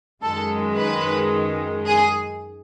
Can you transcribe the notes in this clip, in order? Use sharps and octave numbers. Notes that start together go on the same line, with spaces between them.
F#2 D#3 G#3 A4
B4
G#4